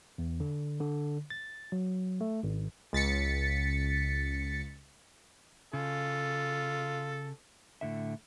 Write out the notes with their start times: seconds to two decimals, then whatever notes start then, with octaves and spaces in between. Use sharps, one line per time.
0.18 E2
0.40 D3
0.80 D3
1.30 A6
1.72 F#3
2.21 A3
2.43 G#1
2.93 C#2 A6 B6 C#7
5.73 C#3 F4 A4
7.81 A2 D3 E5